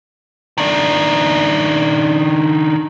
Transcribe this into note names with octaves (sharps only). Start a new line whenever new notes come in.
D#3 D4